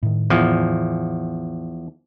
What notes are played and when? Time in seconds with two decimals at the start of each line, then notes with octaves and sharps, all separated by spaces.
0.03 A2 D#3
0.30 E2 F3